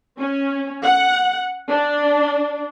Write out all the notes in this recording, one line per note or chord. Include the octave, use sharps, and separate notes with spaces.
C#4
F#5
D4